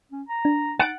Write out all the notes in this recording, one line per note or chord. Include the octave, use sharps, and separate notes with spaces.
C#4
A#5
D4
D#4 F#5 A6 D7